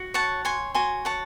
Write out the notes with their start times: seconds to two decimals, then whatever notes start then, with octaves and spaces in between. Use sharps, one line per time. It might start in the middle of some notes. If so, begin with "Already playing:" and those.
Already playing: F#4
0.14 C#5 F#5 A5
0.45 C#5 G#5 C6
0.74 F#4 G#5 C6
1.05 C#5 F#5 A5